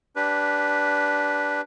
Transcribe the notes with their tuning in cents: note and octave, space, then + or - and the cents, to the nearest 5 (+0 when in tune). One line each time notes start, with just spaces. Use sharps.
D4 -10 G4 +0 B4 -5